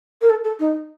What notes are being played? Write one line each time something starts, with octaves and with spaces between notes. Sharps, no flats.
A#4
A4
A4
D#4